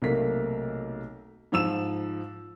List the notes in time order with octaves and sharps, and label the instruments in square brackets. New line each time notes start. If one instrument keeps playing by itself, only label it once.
[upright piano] B1 C3 A3 A#3 A#4 B6
G#2 F3 E6 E7